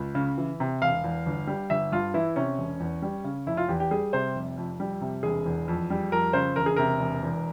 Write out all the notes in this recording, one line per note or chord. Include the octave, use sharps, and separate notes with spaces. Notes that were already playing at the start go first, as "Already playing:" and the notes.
Already playing: C#2
C#3
E3
C3
E1 F5
E2
G1
G3
G1 E5
G2 F4
E3 E4
C3 C#4
E1
E2
G3
C#3
F1 E4
F4
E2 G4
G4
G3 G#4
C3 C5
F1
F2
G3
C3
E1 G#4
E2
F2
G3
F2 A#4
C#3 C5
E1 A#4
G#4
C3 A#4
E1
E2